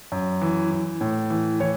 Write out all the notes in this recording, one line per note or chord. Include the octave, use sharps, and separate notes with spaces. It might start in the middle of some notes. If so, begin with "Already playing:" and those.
F#2
E3
E3
A2
E3
E3 C#5